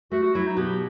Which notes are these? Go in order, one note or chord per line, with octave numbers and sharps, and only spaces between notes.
A3 F#4
F#4
F#3 E4
D#4
B2 G4